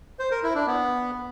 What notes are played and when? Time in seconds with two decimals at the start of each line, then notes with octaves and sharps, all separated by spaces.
0.19 C5
0.31 A#4
0.43 E4
0.55 D4
0.67 B3